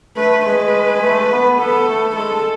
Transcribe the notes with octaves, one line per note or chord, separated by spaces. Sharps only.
A3 B4
G#3 B4
A3
B3
B3 A4
A3
G#3 A4